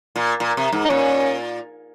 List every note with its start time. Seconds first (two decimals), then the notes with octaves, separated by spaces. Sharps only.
0.16 A#2
0.40 A#2
0.57 C3
0.72 G#2
0.85 D#4
0.89 A#2 C#4